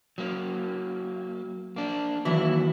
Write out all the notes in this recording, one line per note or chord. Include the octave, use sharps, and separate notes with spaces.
F#3 A#3
A#3 D4
D#2 E3 F#3 E4